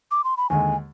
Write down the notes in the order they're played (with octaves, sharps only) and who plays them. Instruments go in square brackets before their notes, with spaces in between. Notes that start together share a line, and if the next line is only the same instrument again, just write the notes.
[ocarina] D6
C6
B5
[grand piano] D#2 D3 G#3 [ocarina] G#5